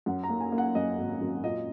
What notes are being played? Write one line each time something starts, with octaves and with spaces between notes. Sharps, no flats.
F#2 F#5
A#5
A#3
G#5
A#3
F#5
F#2 D#5
G#1
F#2
A#2 D#5